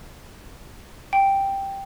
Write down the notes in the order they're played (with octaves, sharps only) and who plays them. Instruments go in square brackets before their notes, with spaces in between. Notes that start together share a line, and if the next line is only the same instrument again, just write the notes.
[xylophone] G5